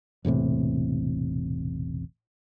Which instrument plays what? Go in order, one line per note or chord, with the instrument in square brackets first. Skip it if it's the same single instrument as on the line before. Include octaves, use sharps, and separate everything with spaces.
[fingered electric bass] E1 A1 A2 C3